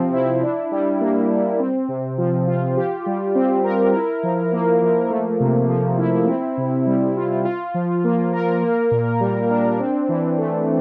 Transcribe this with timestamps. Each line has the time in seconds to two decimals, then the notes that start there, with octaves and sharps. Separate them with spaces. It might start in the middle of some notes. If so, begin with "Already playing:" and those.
Already playing: C3 F3 C4
0.13 E4
0.43 D4
0.72 G3
1.01 A#3
1.30 G3
1.60 C4
1.89 C3
2.18 F3
2.47 F4
2.77 G4
3.06 G3
3.35 C4
3.64 A#4
3.94 E4
4.23 F3
4.52 A#3
4.82 F3
5.10 A3
5.40 C3
5.69 F3
5.99 E4
6.28 C4
6.58 C3
6.87 G3
7.16 F4
7.45 F4
7.74 F3
8.04 A#3
8.33 A#4
8.63 A#3
8.91 A#2
9.20 G3
9.50 D4
9.79 C4
10.09 E3
10.38 A3